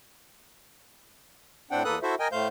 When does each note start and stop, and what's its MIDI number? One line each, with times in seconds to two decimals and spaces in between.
1.71 1.83 45
1.71 1.83 60
1.71 1.83 62
1.71 1.83 78
1.71 1.83 79
1.84 1.99 40
1.84 1.99 58
1.84 1.99 69
1.84 1.99 71
1.84 1.99 87
1.84 1.99 90
2.03 2.15 64
2.03 2.15 66
2.03 2.15 69
2.03 2.15 72
2.03 2.15 76
2.20 2.28 70
2.20 2.28 75
2.20 2.28 79
2.20 2.28 80
2.32 2.48 45
2.32 2.48 57
2.32 2.48 72
2.32 2.48 77
2.32 2.48 91